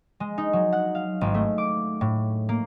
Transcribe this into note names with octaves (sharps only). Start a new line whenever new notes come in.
G#3
D#4
F#3
F#5
F5
G#1
A3
D6
A2
A#3